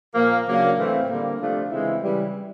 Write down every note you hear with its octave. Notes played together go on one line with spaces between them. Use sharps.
A#2 F3 A#3
C#3 F#3 A#3 D4
A2 E3 A3 C4
D3 G3 A#3
C3 F3 A3 D4 F4
C#3 E3 G#3 C4 E4
C#3 E3 G3